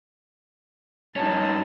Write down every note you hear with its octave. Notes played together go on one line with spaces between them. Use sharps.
G2 C#4 D#4 A5